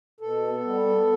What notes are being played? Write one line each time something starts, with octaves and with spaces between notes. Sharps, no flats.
B2 A4
B3
G3
B3